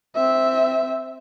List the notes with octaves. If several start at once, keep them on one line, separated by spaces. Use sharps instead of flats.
C4 E5